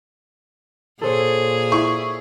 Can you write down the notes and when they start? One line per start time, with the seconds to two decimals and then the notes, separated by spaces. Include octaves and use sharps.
1.01 A#2 G#4 A4 C5 C#5
1.72 E4 C#6